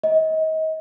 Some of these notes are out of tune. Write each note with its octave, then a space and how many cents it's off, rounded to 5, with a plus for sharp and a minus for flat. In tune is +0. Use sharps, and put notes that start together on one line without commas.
D#5 +30